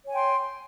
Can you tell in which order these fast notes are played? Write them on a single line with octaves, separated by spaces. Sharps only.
C#5 G#5 G5 C6